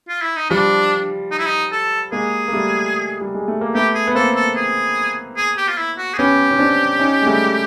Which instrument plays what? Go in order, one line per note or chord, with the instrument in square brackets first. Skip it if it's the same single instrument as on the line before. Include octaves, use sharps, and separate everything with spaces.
[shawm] F4
E4
D#4
[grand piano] F3 G3 [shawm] D4
[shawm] D#4
E4
D#4
A4
[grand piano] G#3 A#3 [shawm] G#4
[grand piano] A#3
G3 A3
G3
G#3
A3
A#3
[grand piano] A3 B3 [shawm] G4
[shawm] G#4
[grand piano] B3
[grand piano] A#3 C4 [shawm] A4
[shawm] A4
G#4
G#4
G4
F4
E4
F#4
G#4
[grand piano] B3 C#4 [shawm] G4
[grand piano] C#4
C4 D4
C#4 D#4
G#3
G3 A3